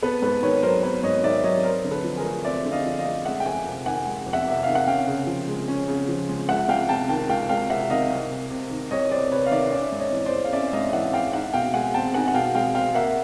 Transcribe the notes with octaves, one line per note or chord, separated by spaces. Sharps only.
B3 A4 B4
G#2 A4 B4
D#3 B4 C#5
F#3 A#4 C5
B3 B4 C#5
G#2 C#5 D#5
D#3 D5 E5
F#3 C#5 D#5
C4 A#4 C5
D3
A4 B4
F3
G#4 A#4
A3
C4 D5 E5
D3
D#5 F5
F3
D#5 F5
A3
G#3 E5 F#5
G5
F2 F#5 G#5
C3
D#3 F#5 G#5
G#3
F2
E5 F#5
C3 E5
D#3 F5
F#5
C#4 F5 G5
C#3
F3
G#3
C#4
C#3
F3
G#3
C#2 E5 F#5
C#2 F5 G5
C3 G5 A5
D#3 G5 A5
C#2 F5 G5
C#2 F5 G5
C3 E5 F#5
D#3 D#5 F5
C2
C2
C3
D#3
C2 C#5 D#5
C2 C5 D5
C3 B4 C#5
F5
D#3 D5 E5
F5
C#4 D5 E5
G#2
C#5 D#5
E3
C5 D5
G#3
F5
C#4 D5 E5
E5
G#2 D#5 F5
E3 E5 F#5
G#3 F5 G5
D#4 E5 F#5
B2 F5 G5
G#3 F#5 G#5
C4 G5 A5
D#4 F#5 G#5
F#5
B2 F5 G5
G#3 F5 G5
C4 F5 G5
A#3 E5 F#5